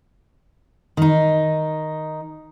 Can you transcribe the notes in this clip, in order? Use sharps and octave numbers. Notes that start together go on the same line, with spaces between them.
D#3 D#4